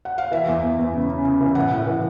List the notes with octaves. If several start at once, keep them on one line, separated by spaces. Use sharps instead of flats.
F#5
F5
E3 E5
E2
E2
E2
C#3
C#3
C#3
E3
A2 F#5
A2
E3